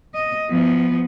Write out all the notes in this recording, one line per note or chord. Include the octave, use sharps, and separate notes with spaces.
D#5
F3 B3